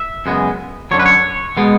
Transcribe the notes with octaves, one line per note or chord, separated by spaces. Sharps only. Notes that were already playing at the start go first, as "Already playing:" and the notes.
Already playing: E5
F#2 C#3 G#3 B3
F#2 D3 F#3 C#5
B4
C#5
B2 G#3 B3